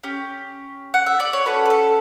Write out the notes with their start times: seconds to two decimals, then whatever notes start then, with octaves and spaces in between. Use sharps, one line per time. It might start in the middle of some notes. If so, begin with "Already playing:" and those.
0.04 C#4 G4
0.94 F#5
1.06 E5
1.20 D5
1.33 C#5
1.46 A3 C#4 F#4 A4 B4
1.65 B4
1.70 A4